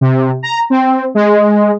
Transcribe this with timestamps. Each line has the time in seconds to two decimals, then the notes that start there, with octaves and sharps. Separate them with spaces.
0.01 C3
0.43 A#5
0.70 C4
1.15 G#3